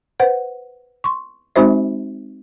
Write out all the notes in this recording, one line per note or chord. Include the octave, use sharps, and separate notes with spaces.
B4 C5 F#5
C6 C#6
G#3 C4 D#4 F#4 C5 E5